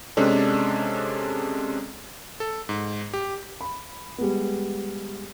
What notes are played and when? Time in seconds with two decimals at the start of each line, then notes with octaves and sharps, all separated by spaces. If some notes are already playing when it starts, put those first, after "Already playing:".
0.17 C3 G#3 C#4 D4 A4
2.40 A4
2.69 G#2
3.14 G4
3.61 B5
4.18 G3 G#3 B3